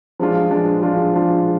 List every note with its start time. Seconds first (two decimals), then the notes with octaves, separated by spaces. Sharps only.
0.19 F3 G#3 D4 F4
0.51 F3 G#3 D4 F4
0.82 F3 G#3 D4 F4
1.13 F3 G#3 D4 F4